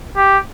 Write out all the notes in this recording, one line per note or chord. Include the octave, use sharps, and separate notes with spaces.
G4